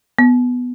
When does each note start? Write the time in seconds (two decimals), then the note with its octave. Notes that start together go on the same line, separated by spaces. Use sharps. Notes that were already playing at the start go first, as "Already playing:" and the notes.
0.19 B3